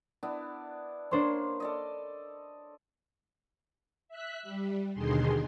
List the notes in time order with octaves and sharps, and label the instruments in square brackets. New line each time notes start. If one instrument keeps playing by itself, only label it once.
[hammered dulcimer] B3 D4 E4
[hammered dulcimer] A#3 C6 [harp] D4 C5 C#5
[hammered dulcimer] A4 D5 D#5
[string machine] E5 F#6 B6
G3
D#2 B2 D3 D#3 G#4 C6